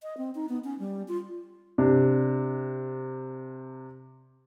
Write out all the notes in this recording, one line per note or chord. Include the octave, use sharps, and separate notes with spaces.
D#5
C4
D#4
B3
C#4
G3
F4
C3 D4